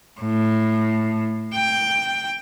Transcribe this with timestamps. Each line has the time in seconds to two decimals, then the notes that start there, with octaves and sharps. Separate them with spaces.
0.21 A2
1.55 G5